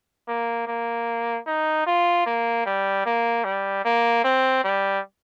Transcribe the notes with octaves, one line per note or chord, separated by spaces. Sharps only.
A#3
A#3
D#4
F4
A#3
G3
A#3
G3
A#3
C4
G3